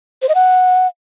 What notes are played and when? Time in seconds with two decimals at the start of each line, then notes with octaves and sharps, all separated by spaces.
0.22 C5
0.29 D#5
0.35 F#5